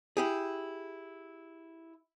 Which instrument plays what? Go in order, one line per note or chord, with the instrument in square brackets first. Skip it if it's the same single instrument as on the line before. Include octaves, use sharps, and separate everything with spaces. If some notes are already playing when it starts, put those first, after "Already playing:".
[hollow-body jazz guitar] E4 G4 G#4